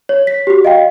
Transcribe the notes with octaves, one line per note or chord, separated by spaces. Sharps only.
C#5
B6
F#4 G4
D#5 F5 G5